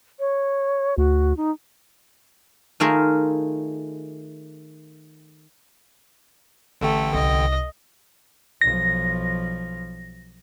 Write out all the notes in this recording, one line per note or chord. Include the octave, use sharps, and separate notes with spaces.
C#5
D2 F#4
D#4
D#3 A3 F4 G#4 A#4
A1 D3 A3 G5
C2 D#5
B1 F3 A#6